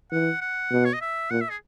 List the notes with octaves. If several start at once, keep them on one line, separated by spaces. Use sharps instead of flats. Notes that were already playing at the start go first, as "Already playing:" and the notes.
E3 F#5
F#5
B2
C#5
D#5
E5
A#2 F#5
E5
G#4